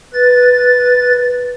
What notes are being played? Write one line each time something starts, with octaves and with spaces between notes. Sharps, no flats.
B4 A6